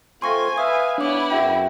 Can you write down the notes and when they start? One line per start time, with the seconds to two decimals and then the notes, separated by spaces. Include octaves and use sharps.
0.22 A3 C4 F4 G#5 C6 C#6 A#6
0.58 B4 E5 F5 D#6
0.98 B3 D4 E4 C#5 D6
1.31 F#2 F#4 G#4 E5 G5